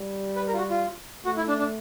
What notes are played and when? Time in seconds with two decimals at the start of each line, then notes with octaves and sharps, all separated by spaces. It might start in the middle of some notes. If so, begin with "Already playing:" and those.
Already playing: G3
0.36 B4
0.47 A#4
0.53 F4
0.58 F#4
0.70 F4
1.25 A3 F#4
1.37 E4
1.48 D4
1.59 D4